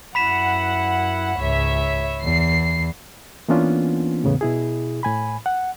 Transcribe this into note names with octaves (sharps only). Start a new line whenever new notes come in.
F#2 E4 F#5 B5 B6 E7
C#2 G#2 C#5 E5
E2 C7
E3 A#3 B3 C#4 D4 F4
E2 A2 C#3 B3
B2 E4 G#4
A2 G#5 B5
F#5